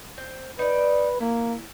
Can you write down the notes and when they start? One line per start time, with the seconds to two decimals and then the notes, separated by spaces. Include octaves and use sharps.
0.18 C4
0.59 D#4 B4 D5
1.20 A#3 E4